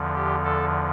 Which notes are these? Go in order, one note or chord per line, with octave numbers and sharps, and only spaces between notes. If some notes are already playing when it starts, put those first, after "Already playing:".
Already playing: E2 D3 F3
G4
A4